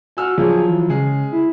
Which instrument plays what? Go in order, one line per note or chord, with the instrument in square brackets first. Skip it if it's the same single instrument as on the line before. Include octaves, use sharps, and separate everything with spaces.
[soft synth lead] F#4 [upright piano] G#5 E6 F6
[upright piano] F3 F#3 [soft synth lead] G#4
[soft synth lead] E3
[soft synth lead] C#3 [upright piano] G#3 G#4
[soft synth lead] E4